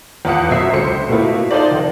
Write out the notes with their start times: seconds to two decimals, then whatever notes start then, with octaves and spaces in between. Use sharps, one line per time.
0.25 E2 F4 F#5 D#6 C#7
0.48 G1 F#2 B2 E5 C7
0.72 C#2 D3 C5 C#7
1.09 B2 A3 A#3 E4 F4
1.51 D#4 F4 A4 C5 D5
1.71 F1